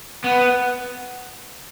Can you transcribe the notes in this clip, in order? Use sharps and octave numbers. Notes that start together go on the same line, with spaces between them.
B3